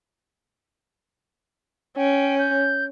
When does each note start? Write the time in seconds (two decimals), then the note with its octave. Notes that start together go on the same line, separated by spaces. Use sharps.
1.97 C#4 G5
2.39 G6